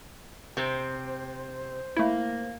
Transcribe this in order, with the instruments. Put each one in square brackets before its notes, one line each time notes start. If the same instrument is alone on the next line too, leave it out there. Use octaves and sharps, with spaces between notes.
[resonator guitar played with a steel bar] C3 C4 [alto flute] C5
[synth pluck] A3 E4 [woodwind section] A#3